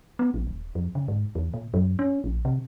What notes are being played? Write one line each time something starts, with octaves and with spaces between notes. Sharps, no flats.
B3
A#1
D#1
F2
C#3
G#2
E2
A#2
F#2
C#4
A#1
C3